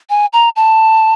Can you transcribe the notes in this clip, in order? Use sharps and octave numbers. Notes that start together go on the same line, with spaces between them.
G#5
A#5
A5